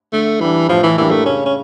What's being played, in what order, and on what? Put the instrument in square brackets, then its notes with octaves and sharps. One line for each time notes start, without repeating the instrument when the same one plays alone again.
[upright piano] D3 [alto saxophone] A3
[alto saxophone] E3 [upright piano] G3 D4
[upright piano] A2 [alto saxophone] F3
[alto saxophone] E3
[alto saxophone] E3 [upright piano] G3 A#3 D4 G4
[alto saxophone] A3
[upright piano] C#3 [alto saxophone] C#4
[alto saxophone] C#4